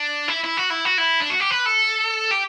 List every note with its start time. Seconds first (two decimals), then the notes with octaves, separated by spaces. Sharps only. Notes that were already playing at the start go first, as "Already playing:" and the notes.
Already playing: D4
0.28 E4
0.44 E4
0.57 F#4
0.70 E4
0.85 F#4
0.98 E4
1.20 D4
1.30 F#4
1.40 G4
1.51 B4
1.66 A4
2.31 G4